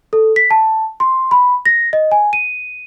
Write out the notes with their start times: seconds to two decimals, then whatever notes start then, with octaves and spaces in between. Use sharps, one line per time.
0.13 A4
0.36 B6
0.51 A5
1.00 C6
1.31 B5
1.66 A#6
1.93 D#5
2.11 G#5
2.33 D#7